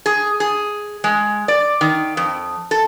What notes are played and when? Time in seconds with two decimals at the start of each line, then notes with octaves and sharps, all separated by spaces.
0.06 G#4
0.40 G#4
1.04 G#3
1.48 D5
1.81 D#3
2.17 F2
2.71 A4